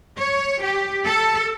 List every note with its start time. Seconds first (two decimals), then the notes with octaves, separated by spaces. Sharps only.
0.18 C#5
0.62 G4
1.05 A4